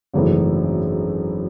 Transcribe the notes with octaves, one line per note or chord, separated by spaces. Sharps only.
G#1 F#2 C#3 E3 A3